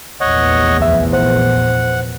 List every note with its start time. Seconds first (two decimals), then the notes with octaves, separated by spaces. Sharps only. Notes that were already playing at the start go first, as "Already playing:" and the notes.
0.21 F1 A#1 E2 C#5 D#5 F#5
0.78 D2 F3 E5
1.13 C5 F#5